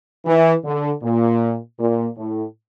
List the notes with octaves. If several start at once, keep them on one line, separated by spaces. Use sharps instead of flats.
E3
D3
A#2
A#2
A2